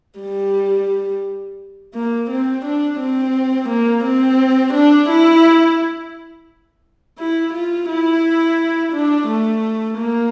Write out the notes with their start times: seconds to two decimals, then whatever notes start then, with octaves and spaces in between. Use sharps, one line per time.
0.20 G3
1.94 A#3
2.30 C4
2.65 D4
3.00 C4
3.69 A#3
4.04 C4
4.73 D4
5.09 E4
7.18 E4
7.53 F4
7.89 E4
8.93 D4
9.27 A3
9.98 A#3